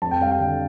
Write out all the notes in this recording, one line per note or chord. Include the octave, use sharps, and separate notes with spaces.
F2 A5
G5
G3 F5
G5
D3